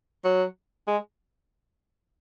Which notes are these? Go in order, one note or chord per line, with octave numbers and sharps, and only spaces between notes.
F#3
G#3